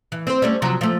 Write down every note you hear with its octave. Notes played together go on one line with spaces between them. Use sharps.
E3
C4 C5
G3 A3 C#4
C3 F3 F#3
F3 A3